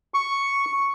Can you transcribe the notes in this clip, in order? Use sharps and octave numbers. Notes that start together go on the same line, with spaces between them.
C#6